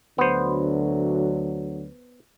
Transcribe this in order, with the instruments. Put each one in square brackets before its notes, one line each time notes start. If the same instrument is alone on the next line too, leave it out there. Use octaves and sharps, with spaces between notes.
[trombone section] D2 D3 F#3 [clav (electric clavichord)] B3 C5